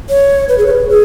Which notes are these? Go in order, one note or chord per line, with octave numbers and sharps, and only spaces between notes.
C#5
B4
G#4
C#5
B4
G#4